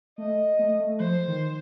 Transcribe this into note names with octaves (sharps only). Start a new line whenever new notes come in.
A3 D#5
A3
A3
F3 C5
D#3